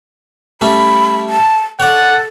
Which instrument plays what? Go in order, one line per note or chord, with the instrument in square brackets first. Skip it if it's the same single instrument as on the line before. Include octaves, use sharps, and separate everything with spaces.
[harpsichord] G3 A3 C#4 [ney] B5
[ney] A5
[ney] A4 [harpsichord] C#5 D5 [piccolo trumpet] F#5